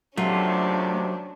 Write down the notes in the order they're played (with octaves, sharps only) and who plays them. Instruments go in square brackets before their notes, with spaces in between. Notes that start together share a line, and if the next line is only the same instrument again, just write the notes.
[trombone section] D#2 C3 [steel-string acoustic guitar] F#3 [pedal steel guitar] A3 F4 [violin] C#4 D4